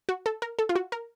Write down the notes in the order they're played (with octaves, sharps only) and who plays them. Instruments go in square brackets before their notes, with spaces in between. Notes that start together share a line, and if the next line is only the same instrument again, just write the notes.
[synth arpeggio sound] F#4
A4
A#4
A4
F4
F#4
A#4